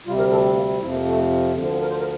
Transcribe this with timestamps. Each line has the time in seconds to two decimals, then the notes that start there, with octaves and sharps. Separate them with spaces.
0.07 D2 C3 G3 F4
0.19 A#4
0.31 A4
0.43 C4
0.56 A#3
0.68 C4
0.80 F2 C3 F3 E4
0.92 A#3
1.05 A3
1.54 D2 D3 F3 A3
1.63 A#3
1.72 C4
1.81 A#4
1.91 C5
2.00 A#4